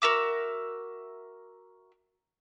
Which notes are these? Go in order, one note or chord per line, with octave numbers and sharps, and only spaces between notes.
F#4 A#4 E5 D6